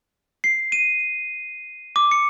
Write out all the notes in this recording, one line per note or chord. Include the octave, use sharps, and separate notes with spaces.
C7
D#7
D6
C#7